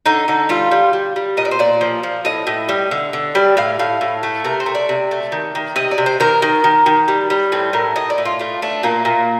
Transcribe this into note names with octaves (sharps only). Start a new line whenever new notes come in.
D3 D#4
D3 D#4
G3 F4
G3
G3
G3
A#2 D#5
D5
C5
A#2 D5
F3
F3
A2 D#5
A2
G3
D3
D3
G3 D5
A2 F5
A2 F5
A2
A3
C3 A#4
C5
A3
D5
C3
A3
D#3
D#3
C3 D#5
D5
C3
C5
D#3 A#4
D#3
D#3
D#3
G3
G3
A2 C4
A2 A#4
A2 D#5
D5
A2
F4
A3 F4
A3 D4
A#2 A#3
A#2